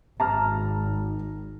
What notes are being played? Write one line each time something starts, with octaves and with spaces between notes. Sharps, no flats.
G#1 A5 A#5 F6